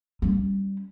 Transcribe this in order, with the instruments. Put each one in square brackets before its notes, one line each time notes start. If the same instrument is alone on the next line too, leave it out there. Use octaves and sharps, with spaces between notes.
[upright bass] G3 C#4